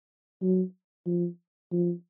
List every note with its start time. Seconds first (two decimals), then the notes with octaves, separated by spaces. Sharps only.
0.42 F#3
1.06 F3
1.72 F3